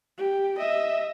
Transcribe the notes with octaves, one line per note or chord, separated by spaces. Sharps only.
G4
D#5 E5